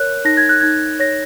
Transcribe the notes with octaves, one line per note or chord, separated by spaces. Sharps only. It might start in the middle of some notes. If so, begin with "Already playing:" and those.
Already playing: A#4 C#5 F#6
D#4 A#6
G#6
F#6
D#4 G#6
C#5 A#6